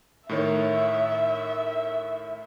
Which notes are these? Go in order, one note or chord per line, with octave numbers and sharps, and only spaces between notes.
A2 D#3 C#5 E5